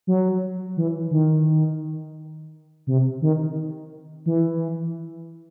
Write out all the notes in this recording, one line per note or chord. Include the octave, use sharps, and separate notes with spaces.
F#3
E3
D#3
C3
D#3
E3